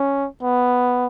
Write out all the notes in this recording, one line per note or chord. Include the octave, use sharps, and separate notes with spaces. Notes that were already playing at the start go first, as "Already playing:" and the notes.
Already playing: C#4
B3